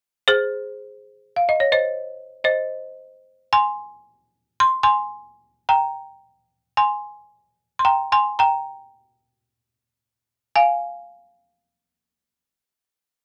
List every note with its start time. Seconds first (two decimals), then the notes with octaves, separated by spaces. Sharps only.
0.28 G#4 C5
1.36 F5
1.49 D#5
1.60 C#5
1.72 C5 D#5
2.44 C5 D#5
3.53 G#5 C6
4.60 C6
4.83 G#5 C6
5.69 G5 A#5
6.77 G#5 C6
7.79 C6
7.85 G5 A#5
8.12 G#5 C6
8.39 G5 A#5
10.56 F5 G#5